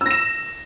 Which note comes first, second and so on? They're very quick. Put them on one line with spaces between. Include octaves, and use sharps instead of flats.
E6 A#6 E7